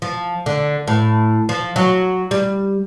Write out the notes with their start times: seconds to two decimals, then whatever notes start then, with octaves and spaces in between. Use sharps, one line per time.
0.02 F3
0.46 D3
0.88 A2
1.49 F3
1.76 F#3
2.31 G3